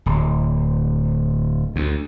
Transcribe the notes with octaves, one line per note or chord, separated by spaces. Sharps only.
D1
D2